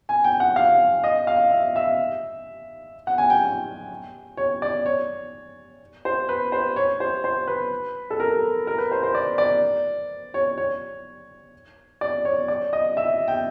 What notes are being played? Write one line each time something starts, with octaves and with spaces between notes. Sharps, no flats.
G#5
G5
F#5
F5
D#5
F5
E5
E5
F#5
G#5
G5
C#5
D5
C#5
C5
B4
C5
C#5
C5
C5
B4
A4
A#4
A#4
B4
C5
C5
D5
D5
C#5
C#5
D5
C#5
D5
D#5
E5
G5